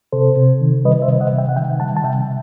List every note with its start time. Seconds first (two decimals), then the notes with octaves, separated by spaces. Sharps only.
0.12 C3 A4 C5
0.37 C3
0.61 D#3
0.85 G3 B4 D#5
1.02 C5 E5
1.08 C3
1.21 D#5 F#5
1.33 C3
1.38 E5 G5
1.49 F#5
1.56 D#3 E5 G5
1.80 G3 F#5 A5
1.97 A5
2.04 C3 E5 G5